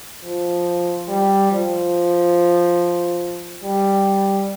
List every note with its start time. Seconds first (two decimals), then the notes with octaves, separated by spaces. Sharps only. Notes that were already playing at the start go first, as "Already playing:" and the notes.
0.24 F3
1.08 G3
1.51 F3
3.64 G3